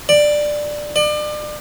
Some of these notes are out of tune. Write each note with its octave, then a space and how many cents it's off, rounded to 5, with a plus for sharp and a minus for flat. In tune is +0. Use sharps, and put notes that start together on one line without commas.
D5 +10
D5 +35